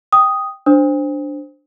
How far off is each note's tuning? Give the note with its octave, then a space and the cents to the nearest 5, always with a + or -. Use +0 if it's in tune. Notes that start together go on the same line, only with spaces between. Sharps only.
G5 +0 D#6 +0
D4 +0 C5 +0 D#6 +35